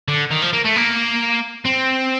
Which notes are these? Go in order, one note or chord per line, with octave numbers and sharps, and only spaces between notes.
D3
D#3
F3
A#3
A3
A#3
C4